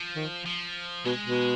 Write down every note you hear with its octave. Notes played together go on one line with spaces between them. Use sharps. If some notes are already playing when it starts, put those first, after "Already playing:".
Already playing: F3
D#3
F3
B2 G#3
B2